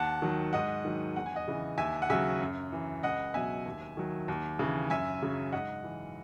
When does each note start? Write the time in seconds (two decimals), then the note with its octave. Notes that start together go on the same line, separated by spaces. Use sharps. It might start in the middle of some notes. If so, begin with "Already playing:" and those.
Already playing: D#2 F#5 A5
0.22 D#3 F#3
0.53 G#2 D#5 F#5
0.85 D#3 F#3
1.16 E2 F#5
1.26 G#5
1.35 D#5 F#5
1.48 C#3 E3
1.78 D#2 E5 G#5
2.02 F#5
2.10 C#3 F#3 E5 G#5
2.41 F#2
2.72 E3
3.03 C#2 D#5 F#5
3.34 B2 F#3 E5 G#5
3.66 D#2
3.97 D#3 F#3
4.28 D#2
4.59 C#3 E3
4.90 F#2 E5 G#5
5.22 C#3 F#3
5.52 G#2 D#5 F#5
5.84 E3